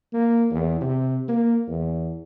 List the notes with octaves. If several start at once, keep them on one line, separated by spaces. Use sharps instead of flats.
A#3
E2
C3
A#3
E2